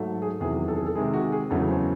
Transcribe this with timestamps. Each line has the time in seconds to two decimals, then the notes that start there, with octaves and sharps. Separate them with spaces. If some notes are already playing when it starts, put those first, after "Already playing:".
Already playing: G#2 F#3 A3
0.22 G#4
0.40 E2 C3 D#3 F#3 G#4
0.68 A4
0.77 G#4
0.86 A4
0.95 C3 D#3 G#3 G#4
1.13 F#4
1.32 G#4
1.50 E2 C#3 F#3 A3 A4
1.69 C5